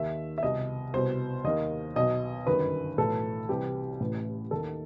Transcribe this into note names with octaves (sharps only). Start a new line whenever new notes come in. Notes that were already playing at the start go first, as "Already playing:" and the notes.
Already playing: D#2 D#3 E5
E5
C2 B2 D#5
C2 B2 C5
D#2 D#3 D#5
B1 B2 D#5
G1 F#2 D#3 B4
B1 A2 E3 A4
C2 C3 E3 G4
A1 A2 E3
D#2 D#3 A4